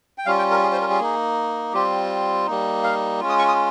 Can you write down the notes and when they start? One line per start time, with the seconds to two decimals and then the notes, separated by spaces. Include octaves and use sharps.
0.18 G5
0.26 G3 C#4 F4 F5
0.39 G5
0.51 A#4
0.63 G#4
0.72 C5
0.81 A#4
0.90 G#4
0.99 A#3 D#4
1.73 G3 C4 F4 G4
2.47 G3 A#3 D#4
2.84 F5
3.20 G#3 C#4 F4
3.29 D#6
3.39 C#6
3.48 D#6